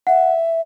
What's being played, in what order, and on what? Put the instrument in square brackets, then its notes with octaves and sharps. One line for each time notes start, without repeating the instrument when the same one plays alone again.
[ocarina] E5 [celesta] F#5